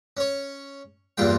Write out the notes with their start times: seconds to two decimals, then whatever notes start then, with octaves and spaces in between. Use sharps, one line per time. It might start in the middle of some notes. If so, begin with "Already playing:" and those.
0.17 C#4 C#5
1.17 E2 G2 A#2 F4 G5